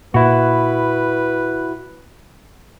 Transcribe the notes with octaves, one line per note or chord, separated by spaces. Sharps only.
A#2 E4 F#4 B4